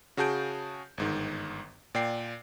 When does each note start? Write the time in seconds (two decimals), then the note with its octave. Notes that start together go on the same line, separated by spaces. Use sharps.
0.17 C#3 F#4 G#4 A5 G6 D7
0.98 G1 G#2 D#3
1.95 A#2 D5 G5 C7